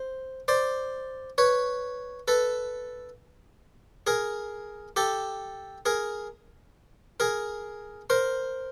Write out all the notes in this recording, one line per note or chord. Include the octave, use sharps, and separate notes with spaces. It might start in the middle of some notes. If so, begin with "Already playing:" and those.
Already playing: C5
C5 D5
B4 C#5
A4 B4
G#4 A#4
G4 A4
G#4 A#4
G#4 A#4
A#4 C5